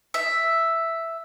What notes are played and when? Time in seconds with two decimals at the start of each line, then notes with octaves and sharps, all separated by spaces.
0.14 E5